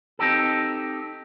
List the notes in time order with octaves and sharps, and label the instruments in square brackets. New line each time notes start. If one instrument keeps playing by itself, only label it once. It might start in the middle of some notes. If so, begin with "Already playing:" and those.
[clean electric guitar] C4 D#4 G4 A4